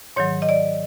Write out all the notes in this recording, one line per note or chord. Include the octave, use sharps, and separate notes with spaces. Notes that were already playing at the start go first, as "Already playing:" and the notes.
G#2 D#3 F#3 C#5
D#5
D5